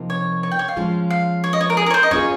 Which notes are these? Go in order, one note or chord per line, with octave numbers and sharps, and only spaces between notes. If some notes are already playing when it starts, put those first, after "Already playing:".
Already playing: C3 F3 A#3 D#4 A#4
C#5
C#5
G5
C#5
F5
F3 G#3 C#4 F4
F5
C#5
D#5
C#5
A#4
G#4
A#4
C#5
C5
D#5
A#3 C#4 F4 G#4 C#5